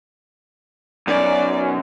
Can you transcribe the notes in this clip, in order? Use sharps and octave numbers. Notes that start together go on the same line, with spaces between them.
F#2 F#3 B3 D#4 D5